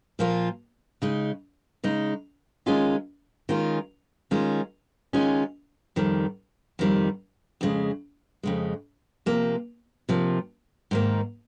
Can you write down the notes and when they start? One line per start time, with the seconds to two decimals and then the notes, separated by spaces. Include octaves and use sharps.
0.19 A#2 F3 A#3 F4
1.02 C#3 G#3 D#4
1.84 C#3 G#3 D#4
2.66 D#3 G#3 C#4 F4
3.49 D#3 G#3 C#4 F4
4.31 D#3 G#3 C#4 F4
5.13 D#3 G#3 C#4 F4
5.96 F2 D#3 G3
6.79 F2 D#3 G3
7.61 F2 C#3 G#3
8.43 F2 C#3 G#3
9.26 C3 F3 A#3
10.09 C3 F3 A#3
10.91 G#2 D#3 A#3